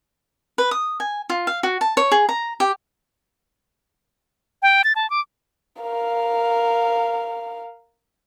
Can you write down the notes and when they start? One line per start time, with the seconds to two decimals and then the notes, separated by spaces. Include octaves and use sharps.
0.58 B4
0.71 D#6
1.00 G#5
1.30 F4
1.47 F5
1.63 F#4
1.81 A5
1.97 C#5
2.12 G#4
2.29 A#5
2.60 G4
4.62 G5
4.84 A6
4.96 A5
5.10 D6
5.82 A#4 F5